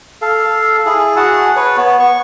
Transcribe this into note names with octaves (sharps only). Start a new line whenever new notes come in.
A4 F5
E4 G#4
F#4 G#4 F#5 A5
B4 C#5
B3
C#6